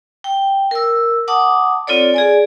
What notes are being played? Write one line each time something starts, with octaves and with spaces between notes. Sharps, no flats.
G5
A#4 E6
F#5 A5 D6 D#6
C4 F4 A4 C#5 D5
G#4 D5 G#5